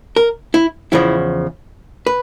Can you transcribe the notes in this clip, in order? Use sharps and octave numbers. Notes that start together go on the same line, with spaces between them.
A#4
E4
E2 C#3 F3 E4
B4